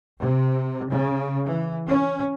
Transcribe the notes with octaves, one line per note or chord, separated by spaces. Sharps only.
C3
C#3
E3
C#4